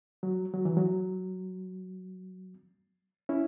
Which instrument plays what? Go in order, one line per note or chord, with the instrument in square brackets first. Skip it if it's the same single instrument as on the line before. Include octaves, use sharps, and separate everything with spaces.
[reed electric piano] F#3
F#3
E3
F#3
C#4 E4